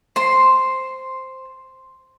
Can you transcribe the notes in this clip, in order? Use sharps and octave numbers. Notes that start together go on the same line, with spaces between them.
C5 C6